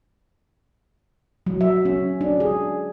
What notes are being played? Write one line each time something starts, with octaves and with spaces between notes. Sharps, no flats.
F#3
E5
C#4
D4
G#4